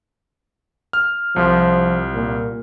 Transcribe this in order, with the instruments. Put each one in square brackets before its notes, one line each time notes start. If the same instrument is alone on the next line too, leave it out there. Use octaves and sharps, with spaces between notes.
[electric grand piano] F6
[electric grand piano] C2 [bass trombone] F3
[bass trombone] A#2